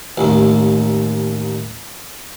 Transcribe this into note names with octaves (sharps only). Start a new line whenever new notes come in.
A1 D#2